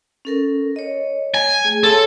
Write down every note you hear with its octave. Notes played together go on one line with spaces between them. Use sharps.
C#4 A4 A#4
C#5 D#5
G#5
A3 G#4
A4 C#5 F5 C6